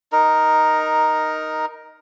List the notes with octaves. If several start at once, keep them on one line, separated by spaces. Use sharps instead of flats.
D#4 A#4